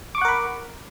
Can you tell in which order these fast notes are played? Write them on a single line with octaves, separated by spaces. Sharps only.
D6 C#6 F#5 A#4 B5